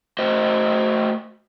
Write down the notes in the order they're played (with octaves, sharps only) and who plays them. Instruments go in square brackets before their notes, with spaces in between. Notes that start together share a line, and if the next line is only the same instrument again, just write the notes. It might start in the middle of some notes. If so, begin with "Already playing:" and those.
[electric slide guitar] A3 F#4 C5 D#5